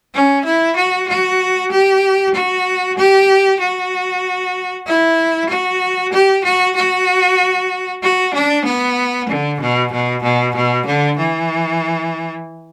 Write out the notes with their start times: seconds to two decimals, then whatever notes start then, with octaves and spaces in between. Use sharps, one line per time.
0.14 C#4
0.45 E4
0.76 F#4
1.08 F#4
1.71 G4
2.34 F#4
2.98 G4
3.60 F#4
4.86 E4
5.49 F#4
6.12 G4
6.44 F#4
6.76 F#4
8.03 F#4
8.34 D4
8.65 B3
9.29 D3
9.60 B2
9.92 B2
10.23 B2
10.55 B2
10.86 D3
11.18 E3